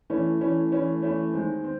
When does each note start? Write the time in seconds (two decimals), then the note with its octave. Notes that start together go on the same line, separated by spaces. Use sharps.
0.10 E3 A3 C#4
0.40 E3 A3 C#4
0.72 E3 A3 C#4
1.02 E3 A3 C#4
1.33 D#3 G#3 C4
1.64 C4